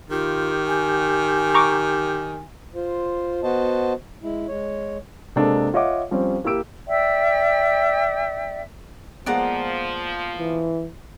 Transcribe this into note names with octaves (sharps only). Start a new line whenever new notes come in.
D#3 F4 G4
G#5
A#5 C#6 D6
F4 C5
B3 F#4 C5 D#5 A5
G#3 E4
G#3 C#5
C3 G#3 A#3 D4 A4
F4 C#5 D#5 E5 F#5 D6
F3 G3 C4 C#4
A#3 E4 G4 E6 D7
D5 E5 G5
F3 G#3 A#3 B3 D5 F#5 A#5
E3